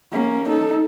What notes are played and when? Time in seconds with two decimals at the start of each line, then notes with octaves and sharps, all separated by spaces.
0.12 A#3 C#4
0.48 D#4 A4